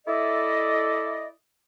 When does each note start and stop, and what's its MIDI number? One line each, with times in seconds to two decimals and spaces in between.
0.08 1.29 64
0.08 1.29 69
0.08 1.29 74
0.08 1.29 75